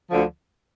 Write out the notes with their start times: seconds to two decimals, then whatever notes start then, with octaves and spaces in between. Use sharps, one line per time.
0.10 D2 D3 F3